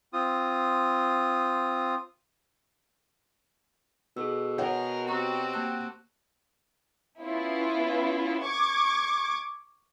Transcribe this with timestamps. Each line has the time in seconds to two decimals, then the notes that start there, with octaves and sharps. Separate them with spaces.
0.13 C4 F4 D#6
4.17 B2 G#4 A4 E6
4.58 G#4 A#4 C#5 F#5 G6
5.08 C4 F#4 G4 A#5 C#6
5.54 A#3 A5 F#6
7.21 B3 C#4 E4 F4 B4
8.43 C#6 D6 G#6